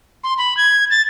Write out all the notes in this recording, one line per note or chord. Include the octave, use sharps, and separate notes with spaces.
C6
B5
G#6
A6